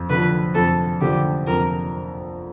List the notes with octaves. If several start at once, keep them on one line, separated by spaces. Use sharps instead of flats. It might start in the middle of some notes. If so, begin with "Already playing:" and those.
Already playing: F2
D3 F3 B4
F2 A4
D3 F3 G4
F2 A#4